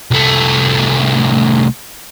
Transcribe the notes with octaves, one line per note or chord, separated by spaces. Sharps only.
C2 A3